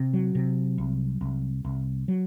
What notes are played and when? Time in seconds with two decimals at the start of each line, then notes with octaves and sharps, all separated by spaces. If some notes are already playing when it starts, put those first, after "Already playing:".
Already playing: C3
0.14 F#3
0.35 C3
0.78 C2
1.21 C2
1.64 C2
2.08 F#3